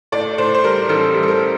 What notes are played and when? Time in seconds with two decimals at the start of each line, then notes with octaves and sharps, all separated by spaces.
0.12 A2 D5
0.38 A2 C5
0.54 C5
0.64 G3 A#4
0.89 A1 A4
1.14 G3
1.23 A4
1.28 A#4